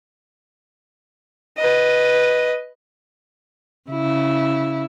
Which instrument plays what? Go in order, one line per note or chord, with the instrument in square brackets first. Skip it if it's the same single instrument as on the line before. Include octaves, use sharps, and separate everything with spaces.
[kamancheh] B4 D#5
[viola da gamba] C#3 E4